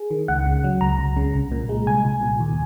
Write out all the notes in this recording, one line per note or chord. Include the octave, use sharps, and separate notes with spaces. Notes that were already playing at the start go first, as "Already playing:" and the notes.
Already playing: G#4
D#3
C#2 F#5
C#3
F#3
C#2 A#5
C#2
C#3
C2
A#2
G#3
C2 G#5
C2
A#2
D#2